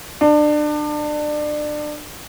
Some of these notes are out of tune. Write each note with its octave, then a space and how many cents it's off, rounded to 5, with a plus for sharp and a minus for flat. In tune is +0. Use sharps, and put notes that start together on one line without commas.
D4 +30